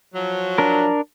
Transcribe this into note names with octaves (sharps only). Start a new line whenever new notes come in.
F3 F#3
D4 A#4